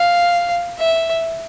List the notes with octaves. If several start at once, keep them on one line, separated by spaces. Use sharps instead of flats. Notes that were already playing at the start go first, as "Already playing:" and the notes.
Already playing: F5
E5